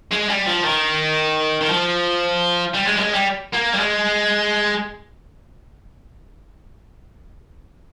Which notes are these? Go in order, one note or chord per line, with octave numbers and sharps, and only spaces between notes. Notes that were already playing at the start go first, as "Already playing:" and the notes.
G#3
G3
F3
D#3
D#3
F3
G3
G#3
G3
G#3
G3
A#3
G3
G#3